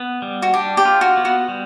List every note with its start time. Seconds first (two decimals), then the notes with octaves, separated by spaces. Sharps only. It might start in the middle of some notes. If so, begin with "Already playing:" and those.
Already playing: B3
0.22 G3
0.42 F#4
0.54 D4 G4
0.77 G4
0.85 F4
1.01 F#4
1.17 B3
1.25 F#4
1.49 G3